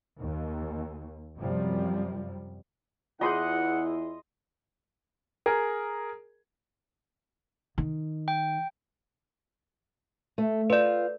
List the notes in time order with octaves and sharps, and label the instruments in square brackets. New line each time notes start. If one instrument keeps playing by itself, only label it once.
[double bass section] D#2
F#2 C3 F3 G3
[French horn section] E2 E4 [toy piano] F4 G#4 C#5 [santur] D#5 C6 [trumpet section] F#5
[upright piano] G#4 A#4
[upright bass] D#3
[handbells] G5
[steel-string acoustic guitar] A3
[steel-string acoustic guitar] F4 [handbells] B4 D5